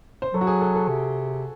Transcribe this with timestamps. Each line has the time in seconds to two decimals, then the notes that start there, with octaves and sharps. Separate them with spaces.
0.22 C5
0.33 F#3 A4
0.41 F#4
0.47 G#4
0.61 A4
0.75 A4
0.88 C3